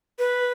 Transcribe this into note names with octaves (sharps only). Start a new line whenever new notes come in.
B4